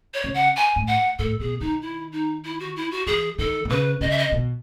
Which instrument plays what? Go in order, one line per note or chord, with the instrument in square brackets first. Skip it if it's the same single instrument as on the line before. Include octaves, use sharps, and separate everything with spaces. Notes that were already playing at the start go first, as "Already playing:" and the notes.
[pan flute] C#5
[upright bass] C#3
[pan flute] F#5
G#5
[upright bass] A2
[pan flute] F#5
[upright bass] A2 [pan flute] A4
[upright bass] B2 [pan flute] G#4
[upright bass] D#3 [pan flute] D#4
[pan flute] E4
D#4
E4
F#4
E4
F#4
[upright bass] E3 [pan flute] G#4
[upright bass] D#3 [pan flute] A4
[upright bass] B2
[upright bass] C#3 [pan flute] B4
[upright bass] C#3 [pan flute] D#5
[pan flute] E5
D#5
[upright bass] B2